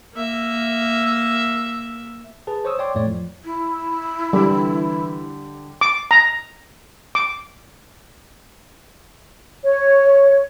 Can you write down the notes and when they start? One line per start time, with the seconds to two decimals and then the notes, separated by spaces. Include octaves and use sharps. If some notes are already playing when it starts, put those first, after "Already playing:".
0.15 A#3 E5
2.47 G#4 B4 A5
2.65 C5 C#5 C#6 D#6 E6
2.79 C#5 D5 G5 C6 D6
2.95 F2 A2 A3 C#5 D5
3.07 F3
3.45 E4
4.33 D3 E3 G3 G4
5.81 D6
6.11 A#5
7.15 D6
9.64 C#5